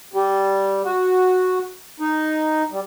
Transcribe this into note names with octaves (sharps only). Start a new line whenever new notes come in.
G3
F#4
D#4
G3